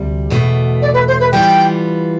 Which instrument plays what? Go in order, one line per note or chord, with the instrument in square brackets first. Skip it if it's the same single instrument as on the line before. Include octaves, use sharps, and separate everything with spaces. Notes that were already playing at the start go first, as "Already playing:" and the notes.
Already playing: [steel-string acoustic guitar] D2 C3 G3
E2 B2 A3
[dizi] D5
B4
C5
B4
[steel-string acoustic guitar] E3 G3 B3 F4 [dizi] G5